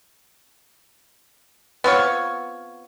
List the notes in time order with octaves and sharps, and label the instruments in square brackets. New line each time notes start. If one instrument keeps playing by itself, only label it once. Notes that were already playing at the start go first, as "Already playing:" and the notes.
[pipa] B3 C4 F4 C#5